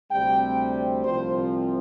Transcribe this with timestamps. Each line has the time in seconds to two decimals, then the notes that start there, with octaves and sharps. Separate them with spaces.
0.12 D2 C3 G3 C4 G5
1.05 C2 C3 F3 C4 C5